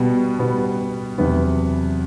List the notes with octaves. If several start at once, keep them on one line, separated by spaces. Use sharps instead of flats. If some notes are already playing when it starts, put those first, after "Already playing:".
Already playing: B2 G3 B3
B2 G3 B3
E2 C3 F#3 B3